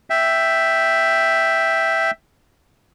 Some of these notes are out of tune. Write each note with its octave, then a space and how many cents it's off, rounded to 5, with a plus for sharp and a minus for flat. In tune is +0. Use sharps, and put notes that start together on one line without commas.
E5 +0 G5 +0